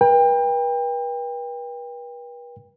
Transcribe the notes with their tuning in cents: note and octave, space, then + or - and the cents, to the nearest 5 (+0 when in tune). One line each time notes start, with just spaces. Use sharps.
B4 -40 G5 +30